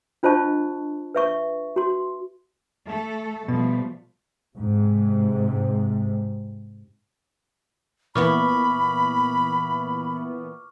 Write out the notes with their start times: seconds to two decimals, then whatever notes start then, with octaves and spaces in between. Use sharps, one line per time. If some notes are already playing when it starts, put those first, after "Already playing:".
0.23 D4 F4 C5 D#5 A5 C#6
1.15 B4 E5 C#6
1.76 F#4 C6
2.87 A3 A4
3.48 B2 F3 G3 A3
4.56 G#2 C3
8.15 A#2 E3 B3 B5 C#6 D6 F6